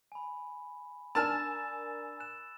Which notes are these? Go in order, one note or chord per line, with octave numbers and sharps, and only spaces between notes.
G#5 B5
D4 A#4 G#5 A5 E6 F6 A6 E7
F#6 E7